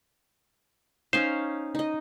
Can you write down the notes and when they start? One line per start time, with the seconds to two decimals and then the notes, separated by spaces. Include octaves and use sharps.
1.13 C#4 D#4 C5 F5
1.75 D#4 D#5